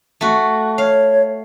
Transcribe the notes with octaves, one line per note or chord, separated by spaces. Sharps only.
A3 F#4
C#5 F5